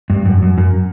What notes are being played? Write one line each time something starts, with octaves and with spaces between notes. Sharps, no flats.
G2
F#2
F#2
F#2